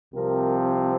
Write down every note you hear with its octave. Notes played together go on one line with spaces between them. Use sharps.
C2 C3 F3 C4 A#4